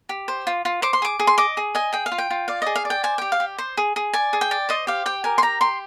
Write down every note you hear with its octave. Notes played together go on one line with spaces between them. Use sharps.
G4
C5
F4
F4
C5 D6
C6
G#4 D6
G#4
C6
D#5 D6
G#4
D#5 G#5
G#4 G5
F5
F4
G5
F4
D5 F5
G#4 D#5
F5
D5
G5
C5 G#5
G4 G5
F5
G4
C5
G#4
G#4
D5 G#5
G#4
G5
D5
C5 D#5
G4 F5
G4 G5
A#4 G#5
C6
G4 A#5
G4 C6